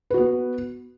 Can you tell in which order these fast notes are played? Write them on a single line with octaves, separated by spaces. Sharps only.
B4 F#4 B3